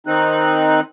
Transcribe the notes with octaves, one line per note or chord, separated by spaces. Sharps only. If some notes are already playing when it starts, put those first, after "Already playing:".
D#3 C4 D#4 F#6